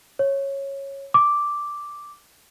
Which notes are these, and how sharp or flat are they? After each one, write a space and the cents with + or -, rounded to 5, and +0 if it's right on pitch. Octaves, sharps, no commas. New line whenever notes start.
C#5 -10
D6 +0